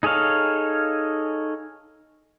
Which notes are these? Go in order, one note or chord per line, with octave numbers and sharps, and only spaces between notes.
D#4 G#4 A4 C#5 F5